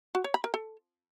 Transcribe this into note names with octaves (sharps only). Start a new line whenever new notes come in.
F#4
C#5
B5
A#4
A4